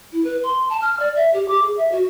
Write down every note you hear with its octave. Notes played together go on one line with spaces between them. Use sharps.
E4
B4
C6
A5
F6
D5
E5
G4
D6
G#4
E5
F#4